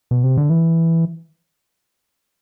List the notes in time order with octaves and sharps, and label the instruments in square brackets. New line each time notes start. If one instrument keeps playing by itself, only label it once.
[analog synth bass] B2
C3
D3
E3